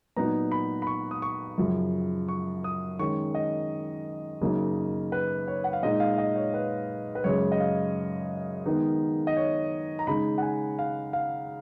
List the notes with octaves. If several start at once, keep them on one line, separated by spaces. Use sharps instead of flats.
A#2 F#3 B3 D#4 A#5
B5
B5
C#6
D#6
C#6
F#2 C#3 F3
C#6
D#6
D#3 G#3 C#4 C#6
D#5
F#2 C#3 F#3 A#3 D#4
B4
C#5
F#5
F5
A#2 G#3 D#4 D#5
F5
D#5
C#5
B4
B4
F#2 C#3 G#3 C#5
D#5
F5
D#3 G#3 B3 D#4
D#5
C#5
A#5
C#3 G#3 D#4 B5
F#5
G#5
F5
F5